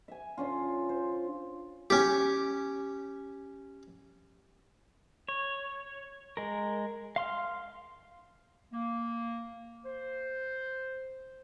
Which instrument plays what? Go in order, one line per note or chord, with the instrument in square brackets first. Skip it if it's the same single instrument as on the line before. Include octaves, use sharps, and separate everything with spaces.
[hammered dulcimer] E5 G#5
D3 C#4 F4
C5
[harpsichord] C#4 G4
[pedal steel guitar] C#5
G#3 A#4
F5 C6 F6
[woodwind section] A#3
C5